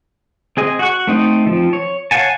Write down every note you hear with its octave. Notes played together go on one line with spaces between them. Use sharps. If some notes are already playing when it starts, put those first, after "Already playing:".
C4 G#4 D#5
F#4 F#5 C#6
A3 C4 D#4
F3 C4
C#5
C#5 F5 F#5 G#5 A5